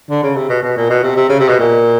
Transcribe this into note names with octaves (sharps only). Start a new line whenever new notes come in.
D3
C#3
C3
B2
B2
A#2
B2
C3
C3
C#3
C3
B2
A#2